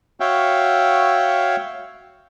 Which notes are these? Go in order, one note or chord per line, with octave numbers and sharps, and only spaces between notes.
F#4 C#5 E5 F5 G5